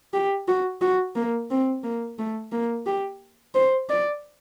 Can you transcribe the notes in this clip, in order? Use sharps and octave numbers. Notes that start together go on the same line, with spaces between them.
G4
F#4
F#4
A#3
C4
A#3
A3
A#3
G4
C5
D5